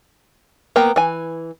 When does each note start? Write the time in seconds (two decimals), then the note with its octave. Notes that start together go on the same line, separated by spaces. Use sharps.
0.76 A#3 B3 G5 A#5
0.96 E3 G#5